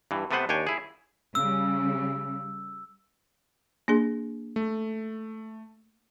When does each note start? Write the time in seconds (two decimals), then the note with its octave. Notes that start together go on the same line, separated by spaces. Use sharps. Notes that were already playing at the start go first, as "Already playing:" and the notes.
0.11 G2 E3
0.31 C3 A3 B3 B4 C5 F#5
0.49 D#2 D4 C#5 G5 G#5
0.67 E4 G#4
1.35 C#3 G3 E6
3.88 A#3 D4 G#4
4.56 A3